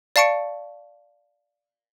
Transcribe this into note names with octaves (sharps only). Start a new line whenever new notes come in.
D5 F5 A5 C#6 C#7 D7